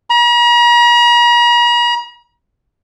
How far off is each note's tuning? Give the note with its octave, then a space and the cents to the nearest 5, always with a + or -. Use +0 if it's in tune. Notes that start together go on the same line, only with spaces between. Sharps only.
A#5 +45